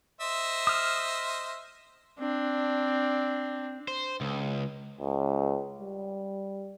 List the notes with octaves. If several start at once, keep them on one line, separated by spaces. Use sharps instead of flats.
C5 D#5 E5
D#6 F6
C4 D4
C5
C#2
C#2
G3